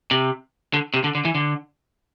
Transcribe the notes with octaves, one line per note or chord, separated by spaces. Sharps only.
C3
D3
C3
D3
D3
E3
D3